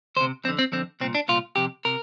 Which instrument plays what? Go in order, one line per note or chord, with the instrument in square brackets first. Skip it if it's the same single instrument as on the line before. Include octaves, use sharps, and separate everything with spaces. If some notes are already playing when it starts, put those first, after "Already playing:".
[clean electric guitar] D2 C5
C3
F2 C4
D3
C4
F2 D3 C4
C2 A#2 C4
D4
C2 A#2 F4
F2 C3 G4
C3 A#4